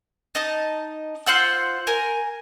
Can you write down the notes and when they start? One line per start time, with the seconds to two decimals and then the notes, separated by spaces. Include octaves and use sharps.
0.35 D#4 D#5 A5
1.26 F4 C5 F#5 E6
1.87 A#4 G#5